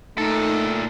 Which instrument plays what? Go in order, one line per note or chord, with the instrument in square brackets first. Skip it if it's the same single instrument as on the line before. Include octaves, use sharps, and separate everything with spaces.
[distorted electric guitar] A#2 A4 [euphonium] A3 [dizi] D#4